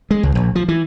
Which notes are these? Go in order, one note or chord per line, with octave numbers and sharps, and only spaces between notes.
G#3
C#2
A#1
F3
E3